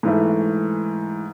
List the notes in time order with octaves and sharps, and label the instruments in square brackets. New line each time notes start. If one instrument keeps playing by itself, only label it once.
[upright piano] G#2 E3 A3